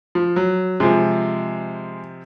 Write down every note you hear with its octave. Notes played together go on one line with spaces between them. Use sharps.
F3
F#3
C3 F3 G#3